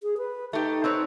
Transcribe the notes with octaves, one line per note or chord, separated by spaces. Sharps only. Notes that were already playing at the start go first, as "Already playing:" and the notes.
G#4
B4
A3 D#4 G4
C4 B4 C#5